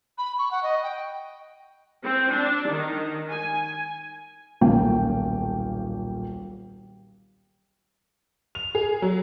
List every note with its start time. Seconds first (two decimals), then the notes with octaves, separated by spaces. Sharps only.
0.18 B5
0.39 C#6
0.51 F#5
0.63 D#5
0.83 G5
2.04 C4
2.33 D4
2.70 D#3
3.31 G#5
4.61 D#1 B1 A#3 C#4 G5
8.55 F7
8.75 G#4
9.02 F#3